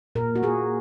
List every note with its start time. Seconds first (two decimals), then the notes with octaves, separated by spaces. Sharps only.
0.15 A#2 A#4
0.36 F#4
0.43 A#3 G#4